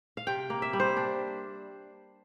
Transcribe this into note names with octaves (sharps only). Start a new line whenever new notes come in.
F5
C3 G5
A#3
E5
G3
C5
D4